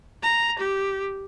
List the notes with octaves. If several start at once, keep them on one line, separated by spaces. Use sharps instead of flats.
A#5
G4